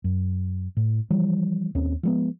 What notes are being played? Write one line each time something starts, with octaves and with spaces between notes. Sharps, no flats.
F#2
A2
E3 F3 G3
D#2 C4 C#4
F3 G#3 B3